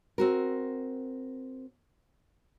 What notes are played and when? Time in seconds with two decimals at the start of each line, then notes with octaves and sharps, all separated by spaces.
0.18 C4 F#4 A#4